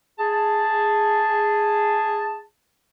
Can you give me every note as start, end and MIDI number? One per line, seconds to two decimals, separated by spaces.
0.19 2.42 68
0.19 2.42 81